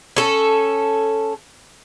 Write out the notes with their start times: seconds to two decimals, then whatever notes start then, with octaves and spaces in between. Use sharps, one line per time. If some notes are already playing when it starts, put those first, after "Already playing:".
0.16 C#4 A4